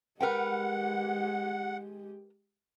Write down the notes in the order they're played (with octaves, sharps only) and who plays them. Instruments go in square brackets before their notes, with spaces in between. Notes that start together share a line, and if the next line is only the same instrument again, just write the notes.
[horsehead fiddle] G#3 G4 [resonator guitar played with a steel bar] A#4 B4 G5 [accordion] F#5